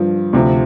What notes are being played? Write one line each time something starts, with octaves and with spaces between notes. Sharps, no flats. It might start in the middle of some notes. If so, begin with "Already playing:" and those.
Already playing: G2 F3
D2 C3 F3